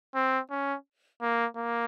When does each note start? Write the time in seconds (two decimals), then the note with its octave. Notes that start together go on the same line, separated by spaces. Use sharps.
0.15 C4
0.51 C#4
1.21 A#3
1.57 A#3